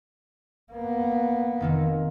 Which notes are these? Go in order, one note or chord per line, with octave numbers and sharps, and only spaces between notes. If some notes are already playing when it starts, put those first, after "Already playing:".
A#3 B3
F1 D#3 A#3